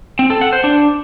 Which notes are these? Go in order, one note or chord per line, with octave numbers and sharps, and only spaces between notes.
C4
A4
F#5
C5
D4